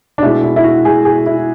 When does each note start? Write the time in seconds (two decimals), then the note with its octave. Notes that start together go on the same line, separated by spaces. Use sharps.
0.18 D4
0.22 B2 G#3 E4
0.44 E4
0.56 E4
0.64 F#4
0.85 B2 G#3 G#4
1.05 G#4
1.26 E4